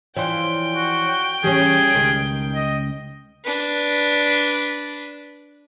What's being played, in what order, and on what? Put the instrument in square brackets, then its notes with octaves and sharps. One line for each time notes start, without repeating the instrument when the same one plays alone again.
[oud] E3 F3 [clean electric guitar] C#5 D5 C6 [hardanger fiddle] G5
[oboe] F#4
[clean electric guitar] E3 [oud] G3 C#4 [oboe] G#4
[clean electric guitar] C#2 [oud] D#3
[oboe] D#5
[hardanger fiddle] D4 B4